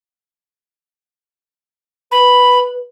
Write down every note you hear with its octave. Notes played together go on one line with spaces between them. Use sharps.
B4 B5